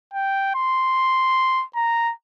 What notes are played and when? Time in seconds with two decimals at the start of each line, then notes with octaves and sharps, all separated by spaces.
0.14 G5
0.55 C6
1.76 A#5